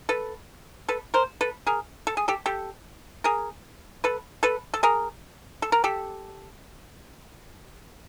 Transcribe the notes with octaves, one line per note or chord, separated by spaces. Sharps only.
A4 B4
A4 B4
A#4 C5
A4 B4
G#4 A#4
A4
G#4
G4 A4
G4 A4
G#4 A#4
A4 B4
A4 B4
A4
G#4 A#4
A4
A#4
G4 A4